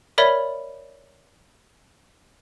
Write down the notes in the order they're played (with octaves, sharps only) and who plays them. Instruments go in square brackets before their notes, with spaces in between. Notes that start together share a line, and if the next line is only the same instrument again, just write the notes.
[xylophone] A#4 C#5 D5 E5 B5